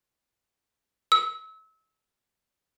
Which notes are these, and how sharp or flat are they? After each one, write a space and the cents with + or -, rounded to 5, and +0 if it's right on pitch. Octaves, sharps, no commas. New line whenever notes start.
E6 -30